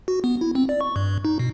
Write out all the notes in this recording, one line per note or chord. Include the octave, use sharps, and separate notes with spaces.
F#4
B3
E4
C4
D5
C#6
G2
D#4
B2